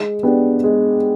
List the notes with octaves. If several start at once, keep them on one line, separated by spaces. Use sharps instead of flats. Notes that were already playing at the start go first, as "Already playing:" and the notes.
Already playing: G#3
B3 D4 G4
G#3